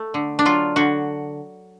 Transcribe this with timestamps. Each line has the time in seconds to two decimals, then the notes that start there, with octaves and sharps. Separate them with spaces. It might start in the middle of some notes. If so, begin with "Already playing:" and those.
Already playing: A3
0.14 D3
0.39 D4
0.45 F#3 F4
0.76 D3 F#4